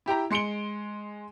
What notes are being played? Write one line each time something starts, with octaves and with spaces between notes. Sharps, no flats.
E4 G4 G5 A#5
G#3 C6 C#7 D7 G7